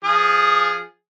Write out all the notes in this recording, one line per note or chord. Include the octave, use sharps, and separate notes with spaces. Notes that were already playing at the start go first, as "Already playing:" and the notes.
F3 G#4 D#6